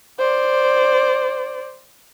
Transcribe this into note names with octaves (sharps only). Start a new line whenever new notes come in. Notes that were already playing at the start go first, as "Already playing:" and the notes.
C5 D5